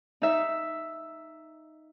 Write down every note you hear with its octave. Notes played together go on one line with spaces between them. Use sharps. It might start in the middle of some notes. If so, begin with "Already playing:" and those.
D#4 E5